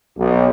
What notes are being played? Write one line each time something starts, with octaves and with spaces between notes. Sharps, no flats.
B1